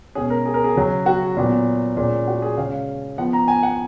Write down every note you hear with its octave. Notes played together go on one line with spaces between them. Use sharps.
B2 G#3 C#4 G#4
A#4
G#4
A#4
G#4
C#3 F#3 C#4
F#4
A#2 F#3 B3
A#2 G#3 C#4
F#4
G#4
C#3 G#3 C#4 F5
F3 B3 F#5
A#5
G#5
F#5